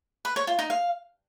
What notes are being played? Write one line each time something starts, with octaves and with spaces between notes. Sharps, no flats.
B4
C#5
F4
D#4
F5